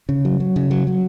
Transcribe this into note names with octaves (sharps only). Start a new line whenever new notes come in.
C#3
F#3
F#3
C#3
F#3
F#3